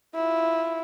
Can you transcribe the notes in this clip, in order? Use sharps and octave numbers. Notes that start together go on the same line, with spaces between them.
E4 F4